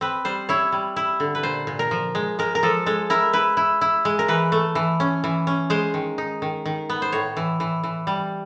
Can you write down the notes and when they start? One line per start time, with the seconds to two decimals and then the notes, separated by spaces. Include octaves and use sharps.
0.01 C4 B4
0.25 G3 C5
0.49 E4 C#5
0.72 G3
0.96 E4
1.20 D3
1.35 B4
1.43 A#2 C5
1.67 A#2
1.79 A#4
1.91 F3
2.15 G#3
2.39 G#3 A#4
2.55 A#4
2.63 F3 A4
2.86 G#3 A4
3.10 E4 A#4
3.33 E4 B4
3.57 E4
3.81 E4
4.05 G#3
4.19 A#4
4.28 E3 B4
4.52 A3
4.75 E3
5.00 C#4
5.24 E3
5.47 C#4
5.70 G#3 C5
5.94 D#3
6.18 D#4
6.42 D#3
6.65 D#3
6.90 B3
7.02 C5
7.12 A2 C#5
7.37 E3
7.60 E3
7.83 E3
8.07 G3